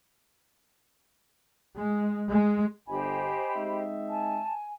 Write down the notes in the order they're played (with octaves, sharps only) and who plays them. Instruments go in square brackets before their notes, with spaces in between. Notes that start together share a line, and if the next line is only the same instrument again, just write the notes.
[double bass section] G#3
G#3
[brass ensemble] G1 [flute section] G4 C5 D#5 [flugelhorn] G#5 [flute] B5
[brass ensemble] G#3 C4 D#4 [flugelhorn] E5
[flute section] G#5 [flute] A5